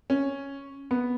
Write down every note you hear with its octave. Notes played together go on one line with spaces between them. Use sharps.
C#4
B3